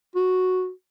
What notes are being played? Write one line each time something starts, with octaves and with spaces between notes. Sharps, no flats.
F#4